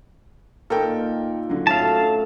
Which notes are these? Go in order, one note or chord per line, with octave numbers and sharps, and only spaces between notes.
A#2 D#3 A4 A#4 G5
D3 F#3
F#2 A2 F5 A5